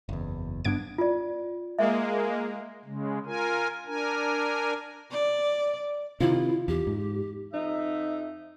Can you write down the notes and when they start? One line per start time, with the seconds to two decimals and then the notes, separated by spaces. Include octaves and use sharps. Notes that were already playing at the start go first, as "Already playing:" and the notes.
0.09 F#1 E2
0.65 G1 G2 B3 D4 G#6 D7
0.98 F4 D5
1.79 G#3 A#3 E5
2.85 C#3 G#3
3.26 F4 A#4 G#5
3.86 D4 A#4 G#5
5.11 D5
6.20 C3 D#3 C4 E4 F4
6.68 E2 G4
6.87 G#2
7.54 F2 F3 D#4 E5